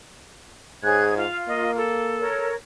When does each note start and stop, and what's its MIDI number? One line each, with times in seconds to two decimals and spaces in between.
0.83 1.24 44
0.83 1.15 68
0.83 1.15 73
0.83 1.05 90
0.83 1.15 92
1.18 1.79 65
1.18 1.37 77
1.48 2.29 58
1.48 1.71 75
1.77 2.50 69
2.19 2.54 70
2.19 2.54 73